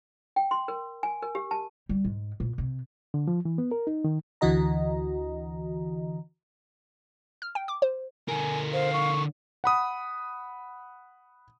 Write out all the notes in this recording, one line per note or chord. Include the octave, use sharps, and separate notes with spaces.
G5
C6
A#4
G#5
A#4
G4
A5
G3
G#2
A#2
C3
D3
F3
E3
B3
A#4
D#4
D#3
D2 D3 E3 F#4 D#5 A#5
F6
G5
D6
C5
D3 A#4 G#5
C5 F5
C#6
F#5 B5 D#6